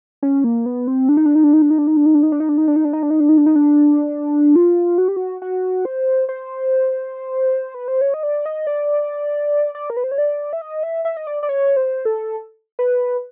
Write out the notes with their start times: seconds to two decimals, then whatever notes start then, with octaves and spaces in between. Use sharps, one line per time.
0.23 C#4
0.44 A#3
0.66 B3
0.87 C4
1.09 D4
1.17 D#4
1.26 D4
1.35 D#4
1.44 D4
1.53 D#4
1.62 D4
1.71 D#4
1.78 D4
1.87 D#4
1.97 D4
2.06 D#4
2.15 D4
2.23 D#4
2.32 D4
2.40 D#4
2.49 D4
2.58 D#4
2.68 D4
2.76 D#4
2.85 D4
2.93 D#4
3.03 D4
3.10 D#4
3.20 D4
3.29 D#4
3.37 D4
3.46 D#4
3.56 D4
4.56 F4
4.98 F#4
5.08 G4
5.16 F#4
5.42 F#4
5.85 C5
6.29 C5
7.74 B4
7.88 C5
8.01 C#5
8.14 D#5
8.23 D5
8.46 D#5
8.67 D5
9.75 D5
9.90 A#4
9.97 B4
10.04 C5
10.11 C#5
10.18 D5
10.53 E5
10.61 D#5
10.83 E5
11.05 E5
11.17 D#5
11.27 D5
11.43 D5
11.49 C#5
11.77 C5
12.05 A4
12.79 B4